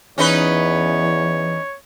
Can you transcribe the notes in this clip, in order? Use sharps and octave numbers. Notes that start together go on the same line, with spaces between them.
E2 E3 C#4 D#4 B4 C#5